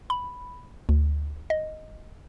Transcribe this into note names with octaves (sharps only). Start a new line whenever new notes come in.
B5
D2
D#5